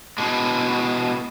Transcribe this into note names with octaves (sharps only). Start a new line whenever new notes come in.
B2 G#3